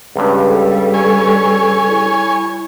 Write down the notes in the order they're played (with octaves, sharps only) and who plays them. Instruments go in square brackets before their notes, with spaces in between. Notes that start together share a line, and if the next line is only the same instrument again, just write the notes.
[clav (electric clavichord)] C#2 G2 [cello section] G3
[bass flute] A4
[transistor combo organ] C#5 G#5
[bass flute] E4